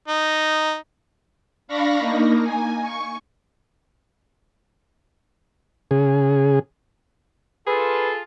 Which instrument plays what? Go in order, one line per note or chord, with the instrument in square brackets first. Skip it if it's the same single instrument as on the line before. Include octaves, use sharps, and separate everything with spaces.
[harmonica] D#4
[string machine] D4 F5 B5 C#6 A#6
A#3 D#4
G#5
C#6
[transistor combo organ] C#3 G#4
[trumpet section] F4 A4 [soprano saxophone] G#4 [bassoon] B4